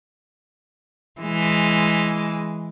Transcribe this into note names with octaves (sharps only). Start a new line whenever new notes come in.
E3 G#3